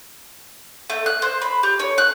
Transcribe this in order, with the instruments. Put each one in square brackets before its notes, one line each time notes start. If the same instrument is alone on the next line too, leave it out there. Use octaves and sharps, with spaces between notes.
[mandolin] A3
F#6
C5
B5
G4
C#5
F#6